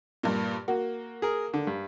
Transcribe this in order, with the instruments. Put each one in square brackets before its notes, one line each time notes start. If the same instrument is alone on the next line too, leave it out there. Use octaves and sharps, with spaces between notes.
[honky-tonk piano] G2 A#2
[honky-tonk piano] A#3 [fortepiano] F#4
[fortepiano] G#4 A#4
D3
G2